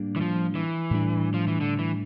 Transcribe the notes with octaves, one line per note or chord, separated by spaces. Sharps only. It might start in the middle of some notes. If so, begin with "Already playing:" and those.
Already playing: A2 G3 A#3 D4
E3
F3
E3
A2 G3 D4
F3
E3
D3
E3